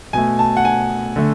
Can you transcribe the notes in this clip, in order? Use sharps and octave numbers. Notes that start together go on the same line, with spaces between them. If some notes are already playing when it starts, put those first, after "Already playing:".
B2 A3 G#5
A5
F#5
G#5
D3 A3